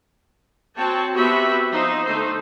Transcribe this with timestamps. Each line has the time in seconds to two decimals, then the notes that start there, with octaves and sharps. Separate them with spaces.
0.75 C4 F#4 C#5 G5 A5
1.15 B3 C4 F#4 G4 B4 E5
1.71 F3 D#4 C5 C6
2.05 D3 A3 D#4 A4 C5